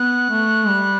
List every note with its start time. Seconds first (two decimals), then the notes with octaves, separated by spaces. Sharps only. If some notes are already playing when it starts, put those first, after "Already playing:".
Already playing: B3 F#6
0.30 A3
0.68 G3